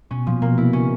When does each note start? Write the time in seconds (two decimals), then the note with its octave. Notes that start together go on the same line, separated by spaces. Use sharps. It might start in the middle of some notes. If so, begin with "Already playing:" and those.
0.11 B2 C#4
0.27 A#2 F3
0.42 B2 A#3
0.58 C3 E4
0.73 C#3 C#4